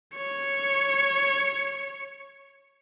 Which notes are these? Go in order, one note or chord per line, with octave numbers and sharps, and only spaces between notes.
C#5 C#7